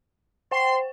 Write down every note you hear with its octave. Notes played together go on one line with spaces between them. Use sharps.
C5 G5 C6